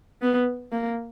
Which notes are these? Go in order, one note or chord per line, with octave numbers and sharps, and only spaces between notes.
B3
A#3